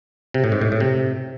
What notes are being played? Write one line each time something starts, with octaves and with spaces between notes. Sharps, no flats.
C3
A2
G#2
A2
A2
C3